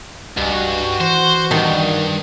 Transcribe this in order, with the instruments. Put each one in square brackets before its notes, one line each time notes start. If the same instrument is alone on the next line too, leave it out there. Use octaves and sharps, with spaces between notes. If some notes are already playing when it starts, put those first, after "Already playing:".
[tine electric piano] C2 D#5 G#5 [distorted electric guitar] G2 [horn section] F#4
[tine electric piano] E3 [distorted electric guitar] C5
[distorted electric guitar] C2 G2 [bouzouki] D#3